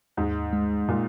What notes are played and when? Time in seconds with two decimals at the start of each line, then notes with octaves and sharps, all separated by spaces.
0.17 D#2 G#2
0.53 G#3
0.88 A#2